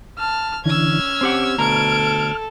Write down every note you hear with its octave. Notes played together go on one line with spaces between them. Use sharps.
A5 F6
D3 E3 C#4 E6 F6 G#6
C4 G4 F#5 D6
D2 B2 A4 A#5 F6 G#6 D7